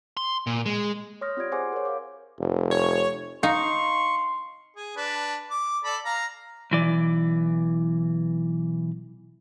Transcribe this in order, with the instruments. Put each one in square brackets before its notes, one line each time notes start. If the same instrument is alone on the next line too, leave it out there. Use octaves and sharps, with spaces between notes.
[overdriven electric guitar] C6
A#2
G#3
[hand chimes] C#5 C6 D#6 F6 A#6
C4 F4 G4 D5 G#6 D7
G#4 C5 F#5 G#5 C6 D6
A#4 C#5
F5 D6
[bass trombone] F1
[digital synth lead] C#5
[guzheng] D#4 [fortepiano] F5 [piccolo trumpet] C6 [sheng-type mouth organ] C#6
[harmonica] G#4
D4 B4
D6
A4 D5 B5
F5 A#5
[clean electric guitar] B1 E3 D5